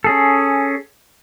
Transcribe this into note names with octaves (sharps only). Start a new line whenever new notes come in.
C#4 G#4 A4